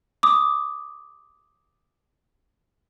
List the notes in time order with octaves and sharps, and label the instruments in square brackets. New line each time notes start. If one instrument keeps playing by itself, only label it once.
[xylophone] D6 D#6